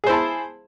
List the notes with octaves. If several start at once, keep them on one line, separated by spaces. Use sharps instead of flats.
E4 G#4 C5 A5